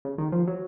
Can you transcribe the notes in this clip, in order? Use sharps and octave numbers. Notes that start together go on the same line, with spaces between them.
C#3
D#3
F3
F#3